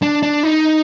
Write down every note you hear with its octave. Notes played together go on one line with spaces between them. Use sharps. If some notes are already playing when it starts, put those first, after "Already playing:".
D4
D4
D#4